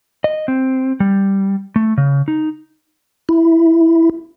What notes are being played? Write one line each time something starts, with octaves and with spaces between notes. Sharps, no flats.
D#5
C4
G3
A3
C#3
D#4
E4